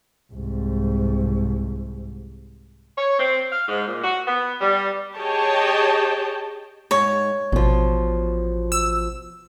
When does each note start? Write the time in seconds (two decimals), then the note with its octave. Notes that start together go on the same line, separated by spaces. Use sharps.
0.32 C2 G#2
2.97 C#5
3.19 C4
3.51 F5
3.68 G#2
3.87 A#2
4.03 F#4
4.27 B3
4.61 G3
5.16 G4 G#4 C#5 D#5 G5 A5
6.91 G#2 C#5
7.52 A1 B2 F3
8.72 E6